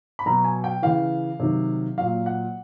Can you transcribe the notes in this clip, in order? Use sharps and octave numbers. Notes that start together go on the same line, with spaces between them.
B5
B2 F#3 A#5
G#5
G5
C#3 E3 F5
C3 D#3 F#3
A#2 F#3 F5
F#5